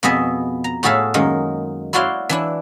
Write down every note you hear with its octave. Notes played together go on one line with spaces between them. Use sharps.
F2 B2 B3 G#4 D#5 E5
A#5
A2 F#4 G#4 A4 E5 F5
F#2 D#3 G#3 A#3
E4 F#4 C#5 D5 F5 C6
E3 D4 E4